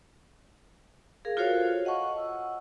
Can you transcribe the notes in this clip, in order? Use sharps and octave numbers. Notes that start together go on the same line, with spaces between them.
G#4 A#4 F5
F4 F#4 A4 C5 C#5 F5
D#5 F#5 A5 C#6
E6